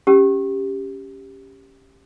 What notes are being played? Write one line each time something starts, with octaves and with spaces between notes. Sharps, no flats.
C#4 G4